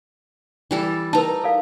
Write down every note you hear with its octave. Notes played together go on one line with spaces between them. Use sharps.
E3 G3 A4
D#4 A#4 B4 A5 A#5
A4 D5 F5